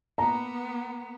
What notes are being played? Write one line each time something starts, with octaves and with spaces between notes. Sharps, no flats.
A#3 B3 A#5